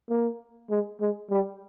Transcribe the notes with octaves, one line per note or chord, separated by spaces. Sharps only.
A#3
G#3
G#3
G3